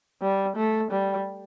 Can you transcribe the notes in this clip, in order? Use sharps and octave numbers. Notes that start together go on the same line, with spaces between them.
G3
A3
G3